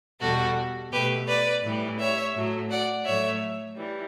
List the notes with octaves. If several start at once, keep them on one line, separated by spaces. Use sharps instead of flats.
E2 B2 G3 F#4 A4
B2 A3 G4 B4
B4 D5
A2 E3 G3
C#5 E5
A2 F#3 A3
D5 F#5
A2 F#3 A3 C#5 E5
E3 G3